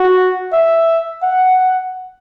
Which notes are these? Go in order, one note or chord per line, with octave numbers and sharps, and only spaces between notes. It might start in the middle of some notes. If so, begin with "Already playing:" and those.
Already playing: F#4
E5
F#5